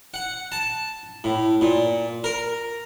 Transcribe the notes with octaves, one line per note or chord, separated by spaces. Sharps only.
F#5
A5
A2
A#2
A#4